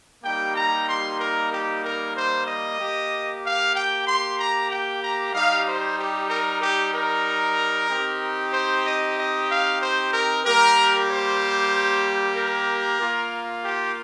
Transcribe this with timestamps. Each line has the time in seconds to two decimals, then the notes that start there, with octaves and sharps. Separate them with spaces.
0.23 G3 A#3 D#4 G4 G5
0.56 A#5
0.88 C6
1.19 A#4
1.51 G4
1.83 A#4
2.15 C5
2.47 D#5
2.79 A#3 G4
3.43 F5
3.74 G5
4.06 C6
4.38 A#5
4.70 G5
5.02 A#5
5.33 G3 D#4 G4 F5
5.66 C5
5.97 G4
6.29 A#4
6.61 G4
6.93 A#4
7.89 C4 D#4 G4
8.52 C5
8.85 D#5
9.17 D#5
9.49 F5
9.81 C5
10.12 A#4
10.44 G3 A#3 G4 A#4
11.08 C5
12.35 A#4
13.00 A#3 F4
13.62 G4